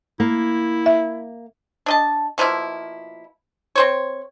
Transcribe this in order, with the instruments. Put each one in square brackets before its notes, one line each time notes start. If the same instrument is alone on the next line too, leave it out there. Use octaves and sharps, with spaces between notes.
[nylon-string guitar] A#3 [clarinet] E4
[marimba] E5
[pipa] D4 D#5 A5
B2 F3 A#3 E4
C4 C5 C#5